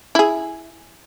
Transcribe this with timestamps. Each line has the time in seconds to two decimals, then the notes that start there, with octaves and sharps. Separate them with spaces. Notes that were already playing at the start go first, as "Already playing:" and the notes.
0.15 E4 G#4